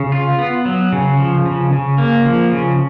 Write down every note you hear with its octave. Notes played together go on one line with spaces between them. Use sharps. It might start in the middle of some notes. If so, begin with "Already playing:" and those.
Already playing: C#3
F4
B3
F#3
C#3
F3
C#3
C#3
A#3
F3
C#3